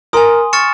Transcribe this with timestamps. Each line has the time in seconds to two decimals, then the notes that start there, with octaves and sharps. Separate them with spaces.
0.13 A#4 G#5 C6 D#6
0.53 C#6 F6 A6 C#7 E7